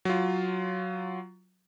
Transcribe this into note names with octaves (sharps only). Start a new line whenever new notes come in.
F#3 F4